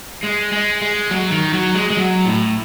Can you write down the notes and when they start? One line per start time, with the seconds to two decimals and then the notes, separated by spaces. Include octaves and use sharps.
0.24 G#3
0.52 G#3
0.82 G#3
1.11 F#3
1.32 D#3
1.54 F#3
1.75 G#3
1.90 G#3
1.97 F#3
2.26 A2